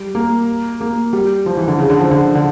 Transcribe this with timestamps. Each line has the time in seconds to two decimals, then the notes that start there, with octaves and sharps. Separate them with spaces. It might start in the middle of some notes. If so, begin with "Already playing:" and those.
Already playing: G3
0.15 A#3
0.81 A#3
1.13 G3
1.46 F3
1.57 E3
1.68 D3
1.79 C#3
1.90 D3
2.01 F3
2.11 D3
2.35 D3